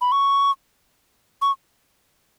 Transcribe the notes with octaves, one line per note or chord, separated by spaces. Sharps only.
B5
C#6
C#6